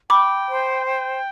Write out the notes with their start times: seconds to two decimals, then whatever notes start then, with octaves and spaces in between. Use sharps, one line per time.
0.10 G5 B5 D6
0.48 C5
0.86 G5